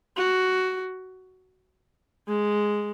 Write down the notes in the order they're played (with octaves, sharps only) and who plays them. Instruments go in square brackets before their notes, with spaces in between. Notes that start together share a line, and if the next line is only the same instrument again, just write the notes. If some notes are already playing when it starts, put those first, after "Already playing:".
[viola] F#4
G#3